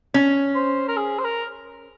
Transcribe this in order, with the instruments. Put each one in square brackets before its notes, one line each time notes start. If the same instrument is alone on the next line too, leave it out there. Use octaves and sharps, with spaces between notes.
[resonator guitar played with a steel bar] C#4
[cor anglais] C5
A#4
G#4
C5
A#4